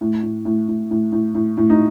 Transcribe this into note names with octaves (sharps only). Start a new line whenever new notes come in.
A2
A2
A2
A2
A2
A2
A2
A2
D#4